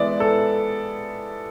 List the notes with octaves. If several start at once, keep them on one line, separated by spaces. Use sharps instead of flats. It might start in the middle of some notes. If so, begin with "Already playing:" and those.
Already playing: E3 G#3 B3 D5 E5
A4